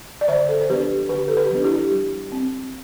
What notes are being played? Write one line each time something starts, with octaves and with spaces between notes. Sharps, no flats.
D5
D3 C5 E5
A4 C5
C5
F3 B3 D4 G4 B4
D3 G4 B4
A4
G4 B4
F3 B3 D4
E4 G4
G3
C4